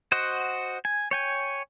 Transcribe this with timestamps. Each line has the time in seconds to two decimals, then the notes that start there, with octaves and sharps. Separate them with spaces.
0.12 F#4 C5 D#5 F#5
0.85 G#5
1.11 C#5 G5 G#5